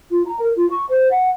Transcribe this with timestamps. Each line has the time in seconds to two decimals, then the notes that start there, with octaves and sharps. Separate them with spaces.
0.11 F4
0.26 A#5
0.39 A#4
0.56 F4
0.70 C#6
0.89 C5
1.10 F#5